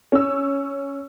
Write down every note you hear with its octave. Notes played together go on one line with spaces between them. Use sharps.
C#4 E6